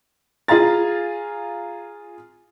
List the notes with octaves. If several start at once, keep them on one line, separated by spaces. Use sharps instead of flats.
F4 G#4 F5 A#5 A6